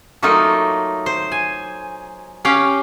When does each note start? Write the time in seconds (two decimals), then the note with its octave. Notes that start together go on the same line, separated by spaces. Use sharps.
0.23 F#3 A3 A#3 D#4 F4
1.06 C5
1.32 G#5
2.45 C#4 G4 F5 G5